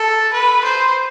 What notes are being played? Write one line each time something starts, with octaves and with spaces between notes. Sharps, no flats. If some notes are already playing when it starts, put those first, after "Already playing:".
Already playing: A4
B4
C5